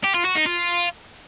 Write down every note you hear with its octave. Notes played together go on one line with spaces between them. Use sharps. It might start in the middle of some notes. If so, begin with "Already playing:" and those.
G4
F4
F#4
D#4
F4